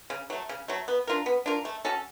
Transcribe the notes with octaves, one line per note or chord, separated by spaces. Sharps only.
C#3
F#3 A3
C#3
F#3 A3
B3
D4 F4 A#4
B3
D4 F4 A#4
A3
C#4 F#4 A4